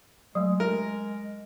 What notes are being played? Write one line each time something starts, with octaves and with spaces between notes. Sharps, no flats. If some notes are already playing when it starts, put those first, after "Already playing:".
F#3 G#3 A3
A#4